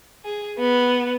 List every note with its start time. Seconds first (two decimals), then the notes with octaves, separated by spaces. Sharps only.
0.25 G#4
0.58 B3